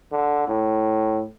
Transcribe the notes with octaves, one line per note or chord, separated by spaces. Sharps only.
D3
A2